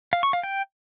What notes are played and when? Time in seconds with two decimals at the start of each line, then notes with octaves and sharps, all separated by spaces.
0.13 F5
0.23 C#6
0.33 F5
0.43 G5